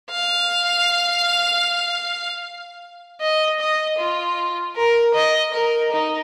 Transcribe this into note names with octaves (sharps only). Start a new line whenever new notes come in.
F5
D#5
D#5
F4
A#4
D#5
A#4
D#4